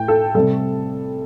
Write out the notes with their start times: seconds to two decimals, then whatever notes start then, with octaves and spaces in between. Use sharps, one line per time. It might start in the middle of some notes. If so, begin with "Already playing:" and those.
Already playing: A2 E3 A3 G5
0.08 A4
0.35 C3 G3 A4